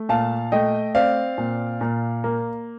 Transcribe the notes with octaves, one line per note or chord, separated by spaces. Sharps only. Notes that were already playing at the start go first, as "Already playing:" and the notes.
Already playing: A3
A#2 F5 A5
A3 D#5 G5
C4 D5 F5
A#2
A#2
A#3